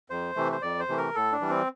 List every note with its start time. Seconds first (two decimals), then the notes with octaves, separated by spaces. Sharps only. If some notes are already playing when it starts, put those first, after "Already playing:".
0.10 F2 C5
0.36 C3 E3 A3
0.52 C5
0.62 F2 D5
0.80 C5
0.88 C3 E3 A3
0.97 A#4
1.15 A2 A4
1.32 D4
1.41 E3 G3
1.50 C4